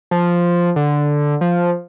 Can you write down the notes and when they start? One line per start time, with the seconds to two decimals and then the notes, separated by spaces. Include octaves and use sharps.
0.11 F3
0.76 D3
1.41 F3